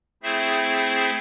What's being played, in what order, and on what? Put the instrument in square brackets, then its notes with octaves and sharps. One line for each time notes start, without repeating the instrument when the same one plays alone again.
[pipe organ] A3 C4 E4 G#4 C5 E5